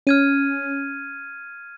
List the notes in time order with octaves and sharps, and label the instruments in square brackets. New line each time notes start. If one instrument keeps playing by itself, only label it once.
[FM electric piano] C#4 [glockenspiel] F6 G#6 D#7